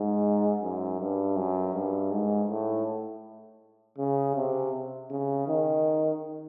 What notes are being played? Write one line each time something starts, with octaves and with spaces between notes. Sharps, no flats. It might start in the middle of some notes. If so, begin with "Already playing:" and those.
Already playing: G#2
F#2
G2
F#2
G2
G#2
A2
C#3
C3
C#3
D#3